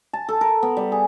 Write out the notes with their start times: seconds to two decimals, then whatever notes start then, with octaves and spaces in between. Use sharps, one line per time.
0.13 A5
0.29 A4
0.41 A#4
0.63 B3
0.77 G3
0.92 G#4